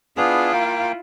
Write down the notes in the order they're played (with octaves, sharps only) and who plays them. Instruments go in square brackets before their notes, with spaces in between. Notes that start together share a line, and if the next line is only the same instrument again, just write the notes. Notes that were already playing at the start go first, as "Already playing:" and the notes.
[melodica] B3 D4 G#4 [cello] E4 F4
[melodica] A#3 G5